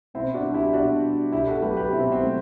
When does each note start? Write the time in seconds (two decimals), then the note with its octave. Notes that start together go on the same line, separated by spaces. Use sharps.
0.14 B2 C4 E4
0.34 D4 F#4
0.45 G3
0.54 E4 G4
0.73 B2 D4 F#4
1.03 G3
1.32 B2 E4 G4
1.47 F#4 A4
1.62 F#3 A3 G4 B4
1.77 G4 B4
1.91 B2 C4 E4
2.12 C4
2.22 F#3 A3